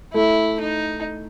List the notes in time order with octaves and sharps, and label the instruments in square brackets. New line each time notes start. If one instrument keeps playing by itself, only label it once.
[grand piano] A3 [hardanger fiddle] E4
[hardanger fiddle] D#4